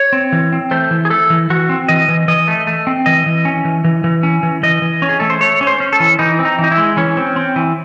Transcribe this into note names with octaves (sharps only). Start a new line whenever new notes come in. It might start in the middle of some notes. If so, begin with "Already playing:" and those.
Already playing: C#5
C4
E3
C4
A3 C5
E3
G#4
A3 A4
E3
E3 F#4
C4
E3 D#5
E3
E3 D#5
A3
A3
C4
E3 D#5
E3
C#4
E3
E3
E3
C#4
E3
E3 D#5
E3
C#4
G#4
A3 A4
C5
A3 C#5
C#4
C5
C#4
A4
E3
E3 D#4
C4
D#4
E3
D#4
E4
G#3
E3 C#4
C4
C4
E3